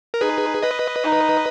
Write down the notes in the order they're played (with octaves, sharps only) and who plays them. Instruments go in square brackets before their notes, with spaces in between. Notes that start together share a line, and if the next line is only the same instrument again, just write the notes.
[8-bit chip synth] A#4
[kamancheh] D#4 [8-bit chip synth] G#4 B4
[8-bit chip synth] B4 D#5
[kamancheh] D#4